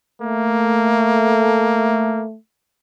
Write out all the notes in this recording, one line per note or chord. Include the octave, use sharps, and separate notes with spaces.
A3 A#3